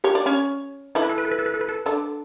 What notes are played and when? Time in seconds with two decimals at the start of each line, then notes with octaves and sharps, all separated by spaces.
0.04 G4 C#5
0.15 D5
0.26 C#4 C#5
0.95 E3 E4 A4
1.03 B4
1.09 A4
1.18 B4
1.25 A4
1.31 B4
1.39 A4
1.46 B4
1.54 A4
1.61 B4
1.69 A4
1.86 D3 D4 A4